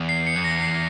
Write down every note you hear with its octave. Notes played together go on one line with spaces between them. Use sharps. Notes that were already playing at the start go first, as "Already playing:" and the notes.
Already playing: E2
C7
C#7
F2
E2 A#6
C7